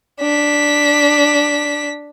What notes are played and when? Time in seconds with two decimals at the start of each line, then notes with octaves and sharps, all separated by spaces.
0.21 D4 B6